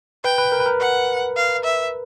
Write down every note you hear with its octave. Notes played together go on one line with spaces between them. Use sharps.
B4 G5
B4
A#4
B4
A#4
F#5
F5
E5